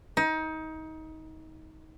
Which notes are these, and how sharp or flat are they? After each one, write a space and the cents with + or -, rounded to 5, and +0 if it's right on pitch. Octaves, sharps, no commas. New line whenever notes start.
D#4 +25